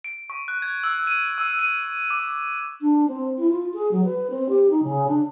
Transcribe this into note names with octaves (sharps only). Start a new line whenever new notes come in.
D7
C#6
F#6
G#6
E6
D#7
E6
D#7
D6
D4
C4
E4
F4
G#4
F#3
B4
C4
G4
D#4
C#3
D4